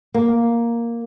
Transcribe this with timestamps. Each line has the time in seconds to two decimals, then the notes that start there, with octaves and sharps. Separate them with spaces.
0.14 A#3